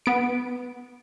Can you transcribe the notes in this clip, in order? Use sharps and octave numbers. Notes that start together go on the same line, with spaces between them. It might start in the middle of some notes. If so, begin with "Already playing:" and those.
B3 D7